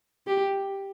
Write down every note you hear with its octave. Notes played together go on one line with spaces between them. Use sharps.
G4